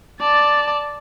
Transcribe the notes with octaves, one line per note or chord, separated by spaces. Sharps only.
D5 A5